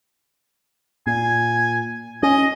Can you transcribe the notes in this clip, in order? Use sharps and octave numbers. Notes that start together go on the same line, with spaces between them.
A#2 G#5
C#4 D#5